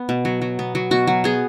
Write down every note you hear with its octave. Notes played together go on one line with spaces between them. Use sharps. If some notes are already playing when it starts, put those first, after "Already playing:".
Already playing: B3
B2
F#3
F#3
B3
F#3
B2 F#4
F#3
B3 G#4